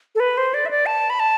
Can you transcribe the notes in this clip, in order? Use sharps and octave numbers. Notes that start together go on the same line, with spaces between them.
A4
B4
C5
D5
E5
D5
A5
B5
A5